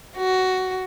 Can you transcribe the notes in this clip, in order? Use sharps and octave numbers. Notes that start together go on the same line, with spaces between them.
F#4